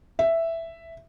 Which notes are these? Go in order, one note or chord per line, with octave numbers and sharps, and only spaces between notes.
E5